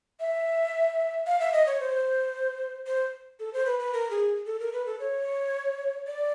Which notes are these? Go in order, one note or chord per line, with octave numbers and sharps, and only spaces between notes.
E5
F5
E5
D#5
C#5
C5
C5
A4
C5
B4
B4
A#4
G#4
A4
A#4
B4
A4
C#5
D5